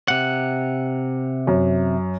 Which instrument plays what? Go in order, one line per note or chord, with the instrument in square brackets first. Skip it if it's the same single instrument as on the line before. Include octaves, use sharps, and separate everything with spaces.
[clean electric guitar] C3 F#5
[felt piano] F#2